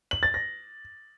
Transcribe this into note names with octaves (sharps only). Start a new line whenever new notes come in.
F#7
A6
A#6